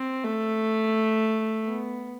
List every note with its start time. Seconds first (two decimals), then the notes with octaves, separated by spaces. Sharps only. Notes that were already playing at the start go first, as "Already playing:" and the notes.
Already playing: C4
0.23 A3
1.65 B3